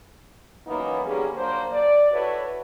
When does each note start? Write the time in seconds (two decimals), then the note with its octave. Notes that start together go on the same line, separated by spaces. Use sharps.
0.67 E3 F#3 A#3 B3 C#4 D#4
1.05 D3 G3 A#3 C#4 G#4
1.36 F3 F#3 A#3 D4 C5
1.72 D5
2.12 E4 F#4 A4 B4 C#5